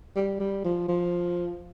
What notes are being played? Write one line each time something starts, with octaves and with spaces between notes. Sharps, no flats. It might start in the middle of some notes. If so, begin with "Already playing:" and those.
G3
G3
F3
F3